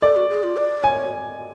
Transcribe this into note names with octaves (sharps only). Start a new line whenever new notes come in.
A4 D5
F#4
G#4
F4
D5
C#5 G#5